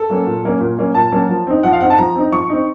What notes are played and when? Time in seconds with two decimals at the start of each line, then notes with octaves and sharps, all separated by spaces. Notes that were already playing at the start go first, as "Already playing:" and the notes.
Already playing: A4
0.10 F#3 A#3 C#4
0.26 A#2
0.44 F#3 A#3 C#4
0.60 A#2
0.78 F#3 A#3 C#4
0.95 A#2 A5
1.12 F#3 A#3 C#4
1.29 F3
1.47 C4 D#4
1.63 F3 F#5
1.73 F5
1.81 C4 D#4 F#5
1.90 A5
1.98 F3 A#5
2.15 C4 D#4
2.32 F3 C#6
2.49 C4 D#4